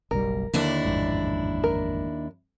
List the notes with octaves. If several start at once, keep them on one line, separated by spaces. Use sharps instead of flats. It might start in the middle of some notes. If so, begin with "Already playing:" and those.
F#1 B1 G3 A#4
D#2 D3 A#3 D4 E4
A1 F2 G#2
A#4